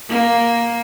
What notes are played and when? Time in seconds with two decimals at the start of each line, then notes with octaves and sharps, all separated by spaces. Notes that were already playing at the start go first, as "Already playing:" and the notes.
0.10 A#3